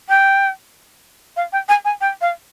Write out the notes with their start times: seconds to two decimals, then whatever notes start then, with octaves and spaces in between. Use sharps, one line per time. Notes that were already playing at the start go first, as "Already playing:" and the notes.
0.09 G5
1.36 F5
1.52 G5
1.68 G#5
1.85 G#5
2.01 G5
2.21 F5